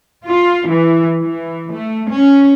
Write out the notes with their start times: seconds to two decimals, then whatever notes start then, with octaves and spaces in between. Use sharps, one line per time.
0.26 F4
0.69 E3
1.21 E3
1.74 A3
2.10 C#4